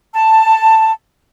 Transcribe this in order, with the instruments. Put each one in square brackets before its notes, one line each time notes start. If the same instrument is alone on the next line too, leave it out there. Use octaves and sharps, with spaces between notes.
[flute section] A5